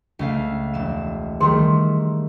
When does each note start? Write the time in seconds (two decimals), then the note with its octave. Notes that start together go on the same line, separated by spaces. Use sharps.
0.19 C#2 A3 F5
0.74 E1 E7
1.40 D#3 G3 A3 G#4 A#4 C6